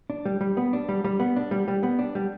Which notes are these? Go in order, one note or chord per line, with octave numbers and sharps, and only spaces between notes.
D4
G3
G3
B3
D4
G3
G3
B3
D4
G3
G3
B3
D4
G3